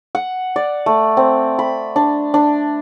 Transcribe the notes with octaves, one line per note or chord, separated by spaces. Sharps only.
F#5
D5
A3
C4
B5
D4
D4